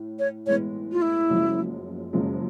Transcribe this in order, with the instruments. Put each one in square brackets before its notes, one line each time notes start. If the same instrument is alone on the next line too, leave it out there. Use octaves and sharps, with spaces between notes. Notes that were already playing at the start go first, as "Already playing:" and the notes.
Already playing: [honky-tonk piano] A2
[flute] C#5
[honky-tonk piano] A2 E3 G#3 B3 [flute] C#5
[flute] F4
E4
[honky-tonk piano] F#1 F#2 C#3 F3 G#3
F#1 F#2 C#3 F3 G#3